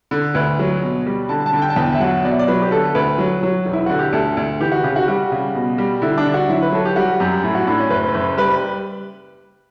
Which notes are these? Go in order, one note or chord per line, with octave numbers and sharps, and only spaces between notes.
D3
D2 B4
F#3
B2
G3
D3 A5
A5
D3
G5
A5
E2 G5
E5
F#3 F#5
B2 D5
E5
D5
F#3 B4
G4
D3 A4
D2 B4
F#3
F#3
E1
E4
D3 F#4
G4
D2 A4
D2
E3 G4
F#4
C#3 G4
F#4
G3 F#4
C#3
B2
G3
D3 E4
D4
D3
F#4
F#3 E4
B4
F#3 A4
G4
G3 F#4
F#2 G4
A2 E4
F#4
A2 D4
C#4
F#1 B4
F#1
G3 B4